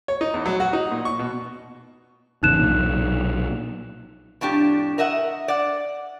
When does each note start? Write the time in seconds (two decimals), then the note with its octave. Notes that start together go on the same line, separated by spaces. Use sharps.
0.08 C#5
0.21 D#4
0.34 E2
0.46 F#3
0.60 F#4
0.73 D#4
0.91 A#2
1.05 C#6
1.19 B2
2.43 G#1 E2 C#3 D#4 F#6 E7
2.59 B1 A#2
4.41 F2 A2 D4 G4
4.98 A#4 D#5 E5 F#5
5.48 D5 F#5